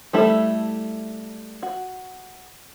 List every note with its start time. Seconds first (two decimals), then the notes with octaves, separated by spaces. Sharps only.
0.13 G3 A3 E4 A4
1.63 F#4